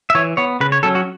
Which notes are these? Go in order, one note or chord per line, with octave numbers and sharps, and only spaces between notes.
E5
E3 C#5
B3 C#5
C#3 B4
C#5
F#3 C#4 A4
F#4